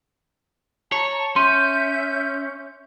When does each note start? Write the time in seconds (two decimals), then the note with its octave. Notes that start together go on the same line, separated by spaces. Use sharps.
0.92 C#5 A5 A#5
1.36 C#4 E5 C6 G6 D#7